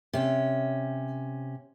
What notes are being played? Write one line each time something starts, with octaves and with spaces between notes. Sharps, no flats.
C3 C#4